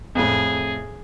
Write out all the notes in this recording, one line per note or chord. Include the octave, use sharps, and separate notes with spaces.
F2 A2 G#4